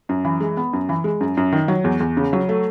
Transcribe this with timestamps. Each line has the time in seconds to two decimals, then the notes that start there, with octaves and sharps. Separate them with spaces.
0.09 F#2
0.25 E3
0.40 G#3
0.57 B3
0.73 F#2
0.89 E3
1.04 G#3
1.21 F#2
1.37 F#2
1.52 D#3
1.68 F#3
1.84 E2
2.00 E2
2.17 C#3
2.33 F#3
2.49 A3